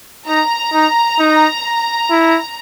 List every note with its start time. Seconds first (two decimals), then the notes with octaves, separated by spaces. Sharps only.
0.27 D#4 A#5
0.73 D#4
1.19 D#4
2.10 E4